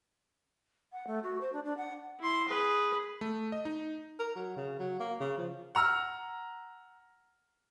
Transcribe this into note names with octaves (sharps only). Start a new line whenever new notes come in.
F#5
A3
F#4
C5
D4
D4
F#5
E4 C6
G#4 B4
A3
D#5
D#4
A#4
F#3
C#3
F#3
A#3
C#3
F3
F#5 A#5 E6 F6